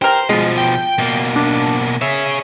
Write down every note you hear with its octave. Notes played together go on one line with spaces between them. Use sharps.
G4 A#4 C5
B2 F3 G#3 F4
G5
B2 A#3
D4
G#4 C#5 E5